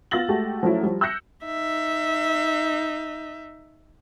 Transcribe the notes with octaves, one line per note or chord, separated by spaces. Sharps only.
B3 F4 E6 A6 A#6 F#7
G#3 A3 F#4 G4
F3 F#3 A3 C#4 E4
F3 G3
E6 F#6 G6 A#6 C#7
D#4 E5